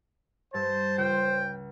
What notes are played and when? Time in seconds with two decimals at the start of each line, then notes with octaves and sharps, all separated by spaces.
0.54 G2 C5 A5
0.98 C#2 G5